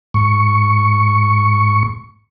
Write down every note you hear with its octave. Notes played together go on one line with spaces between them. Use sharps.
G#2 C#6